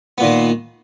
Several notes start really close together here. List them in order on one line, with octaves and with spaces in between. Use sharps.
B3 A#2 D#3